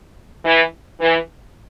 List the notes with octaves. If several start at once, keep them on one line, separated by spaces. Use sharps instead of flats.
E3
E3